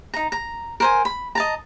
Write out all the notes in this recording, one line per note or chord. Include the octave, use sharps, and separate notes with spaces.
D#4 A#5
A#5
A#4 C5 G#5
B5
D#5 A5 A#5